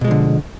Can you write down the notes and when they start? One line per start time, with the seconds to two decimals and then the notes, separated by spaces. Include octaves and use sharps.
0.01 B2
0.04 G#3
0.08 F3
0.11 D3